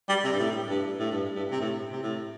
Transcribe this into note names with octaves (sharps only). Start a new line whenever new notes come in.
G3
C3
G2
A2
G2
A2
G2
G2
C3
A2
C3
A2